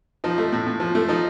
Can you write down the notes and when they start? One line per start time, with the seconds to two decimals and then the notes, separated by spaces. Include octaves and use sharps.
0.24 F3 D#4
0.38 A3
0.52 A2
0.67 A2
0.80 F3
0.95 A3
1.08 F3 D#4